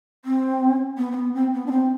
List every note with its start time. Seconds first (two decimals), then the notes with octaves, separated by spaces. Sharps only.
0.25 C4
0.98 B3
1.12 C4
1.16 B3
1.34 C4
1.54 B3
1.66 D4
1.71 C4